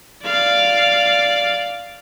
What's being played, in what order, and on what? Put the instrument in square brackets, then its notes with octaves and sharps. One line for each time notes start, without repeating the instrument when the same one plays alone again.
[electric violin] D5 F5